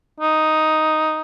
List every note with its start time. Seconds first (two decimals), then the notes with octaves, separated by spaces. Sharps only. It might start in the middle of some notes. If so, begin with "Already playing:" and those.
0.21 D#4